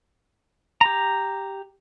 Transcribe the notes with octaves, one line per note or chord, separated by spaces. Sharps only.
G4 A#5